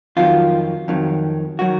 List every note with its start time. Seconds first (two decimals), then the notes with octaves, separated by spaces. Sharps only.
0.17 F2 D#3 F#3 F4
0.88 F2 D#3 F#3
1.59 D#3 F#3 F#4